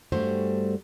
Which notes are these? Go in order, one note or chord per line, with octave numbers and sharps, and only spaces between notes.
G2 G3 A3 F#4 C5